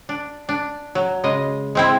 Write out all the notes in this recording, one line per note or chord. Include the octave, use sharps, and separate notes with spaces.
D4
D4
F#3
C#3 G#3 D#5
G#3 C4 E4